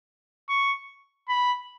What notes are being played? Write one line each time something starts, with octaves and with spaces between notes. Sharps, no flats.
C#6
B5